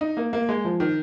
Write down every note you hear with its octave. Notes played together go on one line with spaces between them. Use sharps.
D#4
A#3
A#3
G#3
F3
D#3